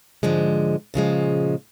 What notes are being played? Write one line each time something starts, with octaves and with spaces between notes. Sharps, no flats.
G#2 D3 F3 G#3
A#2 C#3 F3 G#3